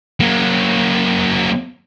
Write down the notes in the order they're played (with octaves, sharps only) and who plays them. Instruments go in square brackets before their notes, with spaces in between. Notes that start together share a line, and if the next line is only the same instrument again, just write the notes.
[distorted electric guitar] F#3 A#3